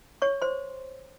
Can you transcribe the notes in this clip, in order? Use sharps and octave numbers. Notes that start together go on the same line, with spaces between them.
C#5 C#6
C5 C6